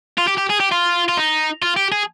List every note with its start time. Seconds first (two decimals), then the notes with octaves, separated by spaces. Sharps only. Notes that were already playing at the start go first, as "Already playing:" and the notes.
0.18 F4
0.28 G4
0.38 G4
0.50 G#4
0.60 G4
0.72 F4
1.09 F4
1.17 D#4
1.62 F4
1.77 G4
1.92 G#4